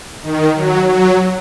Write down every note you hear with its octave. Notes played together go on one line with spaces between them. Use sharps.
D#3
F#3
F#3